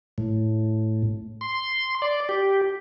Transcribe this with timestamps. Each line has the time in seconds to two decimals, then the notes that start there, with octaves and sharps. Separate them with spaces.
0.18 A2
1.41 C6
2.02 D5
2.29 G4